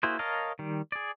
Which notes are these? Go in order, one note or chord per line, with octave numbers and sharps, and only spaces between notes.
A#3 E4 F#4 G#4 C5
A#4 C#5 D#5 F5 A5
D#3 G3
G#4 D5